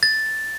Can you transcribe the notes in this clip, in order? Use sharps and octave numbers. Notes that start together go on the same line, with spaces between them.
A6